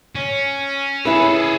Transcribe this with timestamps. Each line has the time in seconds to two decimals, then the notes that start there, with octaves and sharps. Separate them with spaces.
0.15 C#4
1.05 C#4 E4 G#4 A4 B4